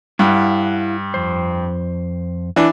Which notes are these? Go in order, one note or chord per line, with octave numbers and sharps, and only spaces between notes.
G2 E4 F5 F#5
F2 C5
E3 D4